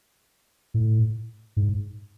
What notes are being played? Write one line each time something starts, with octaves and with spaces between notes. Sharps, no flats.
A2
G#2